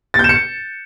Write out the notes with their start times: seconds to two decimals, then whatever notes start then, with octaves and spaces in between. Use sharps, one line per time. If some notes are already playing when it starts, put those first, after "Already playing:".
0.14 A6
0.19 G6
0.24 E7
0.29 C#7